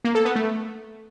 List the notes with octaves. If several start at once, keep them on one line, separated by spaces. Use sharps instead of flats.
A#3
A4
B3
A3